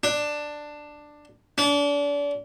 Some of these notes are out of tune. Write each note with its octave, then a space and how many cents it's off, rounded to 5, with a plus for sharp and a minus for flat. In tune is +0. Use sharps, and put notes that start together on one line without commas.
D4 +10
D4 -35